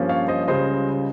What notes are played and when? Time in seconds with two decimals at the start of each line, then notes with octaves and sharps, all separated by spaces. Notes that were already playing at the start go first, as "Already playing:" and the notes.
Already playing: G2 F3 A#3 C#4
0.09 C#5 F5
0.28 C5 D#5
0.48 C#2 C#3 G3 C5 D#5